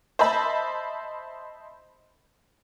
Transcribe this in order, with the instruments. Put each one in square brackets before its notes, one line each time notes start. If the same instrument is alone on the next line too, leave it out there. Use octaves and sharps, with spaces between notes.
[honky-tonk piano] C5 D#5 E5 A5 B5